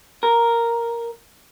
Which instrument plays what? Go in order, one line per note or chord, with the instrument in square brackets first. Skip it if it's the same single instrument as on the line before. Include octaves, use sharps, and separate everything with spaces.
[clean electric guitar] A#4